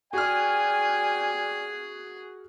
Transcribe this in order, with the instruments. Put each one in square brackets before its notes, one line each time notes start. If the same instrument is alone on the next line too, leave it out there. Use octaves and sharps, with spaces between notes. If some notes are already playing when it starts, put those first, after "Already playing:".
[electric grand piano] F#4 F6 [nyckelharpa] G#4 [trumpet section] D5 G5 G#5